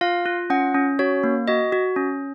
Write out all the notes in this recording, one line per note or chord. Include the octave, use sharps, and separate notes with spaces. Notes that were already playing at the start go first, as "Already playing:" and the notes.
F4 F5
F4
C#4 F#5
C#4
F#4 C#5
A#3
F#4 D#5
F#4
C#4